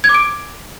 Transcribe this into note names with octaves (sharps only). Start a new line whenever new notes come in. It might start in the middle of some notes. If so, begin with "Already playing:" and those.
G#6
D6
D7